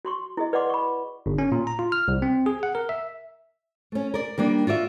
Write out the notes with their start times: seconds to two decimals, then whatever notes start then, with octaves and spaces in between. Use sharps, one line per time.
0.05 F#4 C6 C#6
0.37 E4 G#4 D#5
0.53 B4 D5 D#5 F#5 C6 D6
0.70 B5 C#6
1.26 G1
1.38 C#4
1.52 A#2
1.67 A#5
1.79 F4
1.92 F6
2.08 C2
2.22 C4
2.46 G#4
2.63 F#5
2.75 A#4
2.89 E5
3.92 A3 C#4
4.14 A#4 D5
4.38 D#3 G3 A#3 D4
4.67 F4 F#4 D5 E5